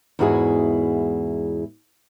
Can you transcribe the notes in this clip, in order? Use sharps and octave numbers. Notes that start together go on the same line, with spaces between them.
E2 G#2 E4 F#4 G#4 G#5